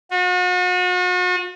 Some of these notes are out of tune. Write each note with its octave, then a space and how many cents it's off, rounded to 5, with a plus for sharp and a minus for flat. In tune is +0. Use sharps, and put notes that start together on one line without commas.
F#4 -40